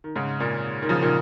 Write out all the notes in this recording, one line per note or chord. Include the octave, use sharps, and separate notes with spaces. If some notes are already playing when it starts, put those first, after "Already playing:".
D#3
G#2 C#3
A#2
D#3
C#3 F3
A#2 D#3